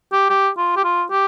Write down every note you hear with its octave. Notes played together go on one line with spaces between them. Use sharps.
G4
G4
F4
G4
F4
G4